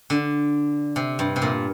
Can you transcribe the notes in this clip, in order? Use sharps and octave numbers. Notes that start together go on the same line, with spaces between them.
D3
C3
G2
C3
A#2